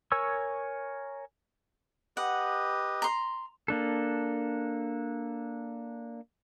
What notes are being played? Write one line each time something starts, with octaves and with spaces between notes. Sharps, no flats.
A#4 C#5 G#5 C#6 E6
G4 B4 D#5 F#5
A#5 C6
A#3 D4 A4